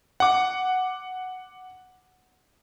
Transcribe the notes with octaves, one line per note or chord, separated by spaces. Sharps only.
F#5 D6